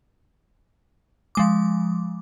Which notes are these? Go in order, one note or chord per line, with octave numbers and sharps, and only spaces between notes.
F3 G#3 D6